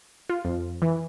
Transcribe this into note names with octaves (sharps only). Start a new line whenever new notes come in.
F4
F2
E3